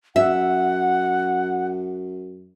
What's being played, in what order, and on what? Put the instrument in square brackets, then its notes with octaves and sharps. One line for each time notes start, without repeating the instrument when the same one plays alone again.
[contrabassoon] F#2 [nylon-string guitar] E5 [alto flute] F#5